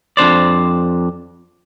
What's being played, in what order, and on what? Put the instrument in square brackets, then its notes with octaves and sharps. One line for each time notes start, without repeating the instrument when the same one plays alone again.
[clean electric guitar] F2 D4 C5 D5